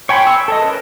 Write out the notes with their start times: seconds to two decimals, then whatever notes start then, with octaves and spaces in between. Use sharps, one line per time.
0.09 C#5 G5 G#5 B5 C6
0.27 E6
0.48 A4 C#5 D#5
0.62 C#4 A#4 B4